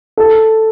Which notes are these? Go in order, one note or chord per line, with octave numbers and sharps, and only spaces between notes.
A4